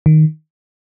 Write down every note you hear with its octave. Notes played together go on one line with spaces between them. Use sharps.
D#3